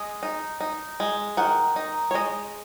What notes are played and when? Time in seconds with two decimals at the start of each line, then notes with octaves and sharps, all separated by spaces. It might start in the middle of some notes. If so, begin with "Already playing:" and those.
Already playing: G#3 D#5
0.23 D#4
0.61 D#4
1.00 G#3
1.37 D#3 F#5
1.76 D#4
2.11 C#5
2.14 G#3 D#5